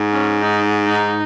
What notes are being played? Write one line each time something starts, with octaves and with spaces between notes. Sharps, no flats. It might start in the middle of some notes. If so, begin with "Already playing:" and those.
Already playing: G#2
C#4
D#4
D#4